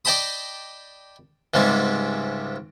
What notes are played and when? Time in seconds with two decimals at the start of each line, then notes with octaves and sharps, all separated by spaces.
0.05 D5 D#5 G5 A5 B5 D#6
1.54 C#2 G#2 C3 G3